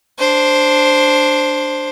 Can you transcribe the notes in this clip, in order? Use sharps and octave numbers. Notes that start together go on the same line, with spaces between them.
D4 C5